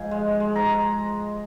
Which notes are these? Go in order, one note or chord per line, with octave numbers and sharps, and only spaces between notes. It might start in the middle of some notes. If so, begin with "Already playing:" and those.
Already playing: G#2 F3 G#5
G#3
G#3
A#5